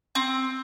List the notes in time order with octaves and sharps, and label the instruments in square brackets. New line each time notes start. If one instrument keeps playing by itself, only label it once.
[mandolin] C4